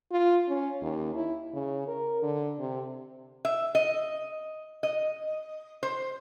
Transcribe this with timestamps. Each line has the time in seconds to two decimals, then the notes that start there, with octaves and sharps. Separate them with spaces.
0.12 F4
0.49 C#4
0.82 D#2
1.15 E4
1.53 C#3
1.87 A#4
2.22 D3
2.59 C3
3.45 E5
3.75 D#5
4.83 D#5
5.83 C5